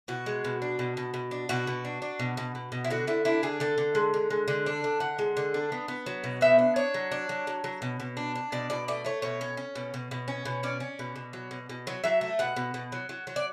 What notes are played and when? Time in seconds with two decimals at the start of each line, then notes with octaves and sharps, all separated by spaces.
0.08 B2 F#4
0.26 G#3
0.45 B2
0.62 D4
0.79 B2
0.97 B2
1.14 B2
1.31 D4
1.49 B2 F#4
1.67 B2
1.85 D4
2.02 D4
2.19 B2
2.37 B2
2.55 B2
2.72 B2
2.84 E4
2.90 D3 F#4
3.07 D3 E4
3.25 D4 E4
3.43 D3 G#4
3.60 D3 A4
3.78 D3
3.95 G#3
4.14 D3
4.30 G#3
4.48 D3
4.66 D4
4.84 D3
5.00 D3 F#5
5.19 G#3
5.37 D3
5.54 D4
5.72 B3
5.88 B3
6.06 F#3
6.24 B2
6.41 B3 E5
6.59 D4
6.76 D4 C#5
6.94 F#3
7.11 D4
7.29 F#3
7.47 F#3
7.64 F#3
7.82 B2
8.00 B2
8.17 D4
8.36 D4
8.52 B2 D5
8.70 B2 D5
8.88 A3 D5
9.05 A3 C#5
9.22 B2 C#5
9.41 C#4
9.57 C#4
9.75 B2
9.94 B2
10.11 B2
10.28 C#4
10.45 B2
10.63 C#4 D5
10.80 C#4
10.99 B2
11.16 B2
11.33 F#3
11.51 B2
11.69 B2
11.87 F#3
12.04 F#3 E5
12.21 A3
12.39 B2 F#5
12.56 B2
12.74 B2
12.92 F#3
13.09 F#3
13.27 F#3
13.36 D5